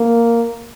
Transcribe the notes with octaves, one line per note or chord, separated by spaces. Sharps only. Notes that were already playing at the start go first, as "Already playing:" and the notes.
Already playing: A#3